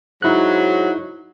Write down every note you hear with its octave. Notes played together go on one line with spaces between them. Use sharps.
G#2 F#3 D#4 E4 F#6